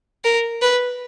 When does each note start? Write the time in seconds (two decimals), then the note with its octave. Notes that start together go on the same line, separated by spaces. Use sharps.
0.25 A#4
0.62 B4